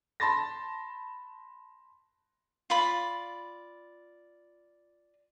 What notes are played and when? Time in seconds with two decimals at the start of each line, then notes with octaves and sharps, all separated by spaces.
0.20 A5 B5 C6 A6 A#6
2.70 F4 D5 B5